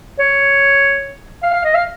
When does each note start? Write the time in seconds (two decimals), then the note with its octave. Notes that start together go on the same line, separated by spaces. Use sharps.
0.19 C#5
1.43 F5
1.53 F5
1.64 D#5
1.75 F5